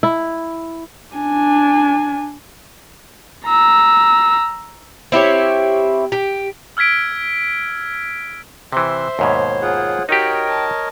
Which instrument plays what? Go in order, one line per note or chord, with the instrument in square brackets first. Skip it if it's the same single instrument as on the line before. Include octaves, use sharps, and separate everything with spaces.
[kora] E4
[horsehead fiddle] D4 G#5
[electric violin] A#5 E6
[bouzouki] C4 E4 G4 C#5
G4
[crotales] E6 F6 G#6 B6 D7
[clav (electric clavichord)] C3 E3 [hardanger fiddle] C5 [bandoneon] E5
[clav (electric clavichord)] D#2 G#2 B2 [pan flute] C#5
[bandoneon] F4 G#4 F#5
[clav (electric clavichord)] D#4 G4 [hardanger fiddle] F#4 [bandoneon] A#4 C#5 D#5 [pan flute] G5
[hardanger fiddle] A5